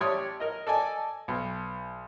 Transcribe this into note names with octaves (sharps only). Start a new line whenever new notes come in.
A1 G4 C#5 D5 C6 D#6
A#4 D#5
A4 D5 D#5 G#5
B1